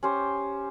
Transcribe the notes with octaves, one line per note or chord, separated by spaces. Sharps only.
C#4 G4 C5